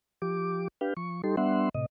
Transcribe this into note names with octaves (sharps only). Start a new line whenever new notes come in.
F3 G4 D6
D4 G4 B4 F5 G5
F3 C#6
G3 D#4 G4 A4 C6
G3 B3 D4 E5 F#5 C6
A2 C3 D#5